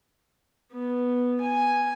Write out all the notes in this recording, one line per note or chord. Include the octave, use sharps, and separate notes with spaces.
B3
G#5